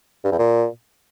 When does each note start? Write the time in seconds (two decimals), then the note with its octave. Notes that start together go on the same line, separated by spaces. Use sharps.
0.25 G2
0.32 E2
0.39 A#2